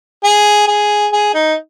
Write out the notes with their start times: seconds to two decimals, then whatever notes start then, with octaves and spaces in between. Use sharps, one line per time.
0.24 G#4
0.67 G#4
1.12 G#4
1.34 D#4